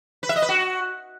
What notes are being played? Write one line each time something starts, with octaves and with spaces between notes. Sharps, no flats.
B4
E5
D#5
B4
F#4